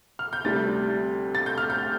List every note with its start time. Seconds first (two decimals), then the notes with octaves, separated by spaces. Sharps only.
0.19 F6
0.33 G6
0.44 D2 C3 G3 A6
1.35 A6
1.46 G6
1.58 F6
1.70 G6